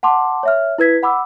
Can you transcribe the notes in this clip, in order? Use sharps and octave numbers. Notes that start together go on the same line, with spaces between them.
F#5 A5 C6 D6
C#5 E5 F6
E4 B4 G#6 B6
F#5 B5 D6 E6